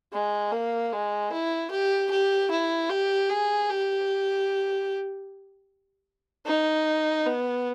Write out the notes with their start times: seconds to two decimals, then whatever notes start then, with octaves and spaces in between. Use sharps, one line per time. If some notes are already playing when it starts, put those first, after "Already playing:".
0.13 G#3
0.52 A#3
0.92 G#3
1.32 E4
1.71 G4
2.11 G4
2.51 E4
2.90 G4
3.30 G#4
3.70 G4
6.47 D#4
7.26 B3